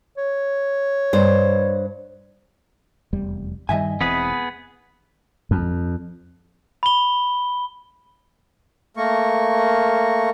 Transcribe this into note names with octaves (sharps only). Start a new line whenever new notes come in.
C#5
G2 C5
F1 E2 G3
G2 D#3 G3 D#5 E5 G#5
E1 E3 B3 C4 G#4 B4
F2
B5 G7
A3 A#3 A#4 C#6